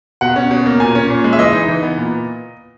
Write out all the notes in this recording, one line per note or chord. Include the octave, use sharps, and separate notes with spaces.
B2 F#5
C#4
B2
A#3
A#2 G#5
C#4
A#2
G#3
E5
E3 D#5
D#4
E3
B3
A#2